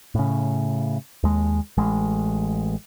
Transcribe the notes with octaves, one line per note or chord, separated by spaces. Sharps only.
A2 C#3
D#2 G#3
A1 G#3